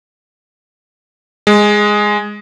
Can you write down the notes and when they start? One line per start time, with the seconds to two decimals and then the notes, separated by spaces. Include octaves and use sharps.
1.47 G#3